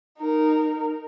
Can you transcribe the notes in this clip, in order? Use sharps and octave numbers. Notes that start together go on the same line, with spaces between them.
D#4 A#4